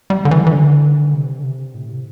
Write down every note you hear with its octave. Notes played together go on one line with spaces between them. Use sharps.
G3
D3
E3
E3
D3
C3
D3
C3
A2
C3